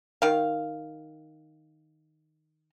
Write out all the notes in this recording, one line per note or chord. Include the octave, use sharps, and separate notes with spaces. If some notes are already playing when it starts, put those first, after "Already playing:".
D#3 F5